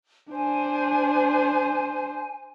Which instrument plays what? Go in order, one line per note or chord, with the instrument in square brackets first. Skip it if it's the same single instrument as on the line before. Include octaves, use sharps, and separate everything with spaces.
[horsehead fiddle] D4 C5 [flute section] G#5